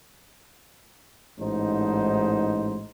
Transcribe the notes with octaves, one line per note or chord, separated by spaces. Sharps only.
A1 G#2 D#4 C5